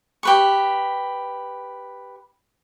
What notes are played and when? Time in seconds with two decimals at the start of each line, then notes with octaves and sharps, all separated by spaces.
0.23 G4 B4 C#6